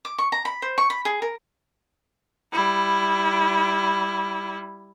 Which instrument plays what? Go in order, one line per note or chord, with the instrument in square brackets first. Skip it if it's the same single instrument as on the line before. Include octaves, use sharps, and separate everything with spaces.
[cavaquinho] D6
C#6
A#5
B5
C5
C#6
B5
G#4
A#4
[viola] G3 E4